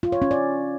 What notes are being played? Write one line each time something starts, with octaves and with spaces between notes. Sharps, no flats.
F4
C#5
C#4
D5